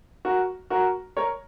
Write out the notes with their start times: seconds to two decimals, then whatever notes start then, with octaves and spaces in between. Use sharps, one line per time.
0.25 F#4 A#4
0.70 F#4 A#4
1.17 A#4 C#5